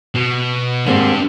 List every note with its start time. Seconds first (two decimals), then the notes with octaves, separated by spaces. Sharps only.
0.15 B2
0.86 D#2 G#2 G3 C4 D4